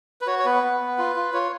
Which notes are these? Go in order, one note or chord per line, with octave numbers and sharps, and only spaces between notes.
B4
F#4 C#5
C#5
B3 B4
B3
B3
F4
F4
F4 C#5